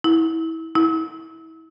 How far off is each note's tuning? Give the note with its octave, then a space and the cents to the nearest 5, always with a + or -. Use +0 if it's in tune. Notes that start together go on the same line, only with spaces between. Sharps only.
E4 -25
E4 -30